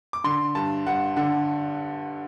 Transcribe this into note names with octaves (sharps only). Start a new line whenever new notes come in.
D6
D3 C6
G2 A5
G2 F#5
D3 F#5